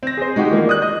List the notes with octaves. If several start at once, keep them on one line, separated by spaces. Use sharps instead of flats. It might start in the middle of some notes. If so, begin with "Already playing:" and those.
C4 A#6
G#4 C5
G#3 D#4 F#4 G4
E3 F3 G#3 A#3
D5 D#6 F#6
D#5